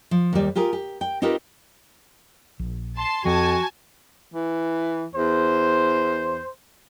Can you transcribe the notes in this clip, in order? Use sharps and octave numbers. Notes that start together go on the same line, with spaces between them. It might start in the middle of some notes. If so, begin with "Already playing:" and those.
F3
D#2 G3
F4 G4 G#4 A#4
G4
G5
C4 D#4 F4 G4 A#4 B4
A#1
A5 C6
F2 F3 F#4 G#5 A5
E3
E2 C5